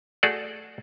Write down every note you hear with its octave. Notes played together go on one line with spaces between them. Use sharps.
A3 F#4 G#4 A4 D5